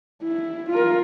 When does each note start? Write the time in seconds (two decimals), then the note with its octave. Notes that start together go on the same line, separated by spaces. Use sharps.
0.23 E4
0.70 F4 A#4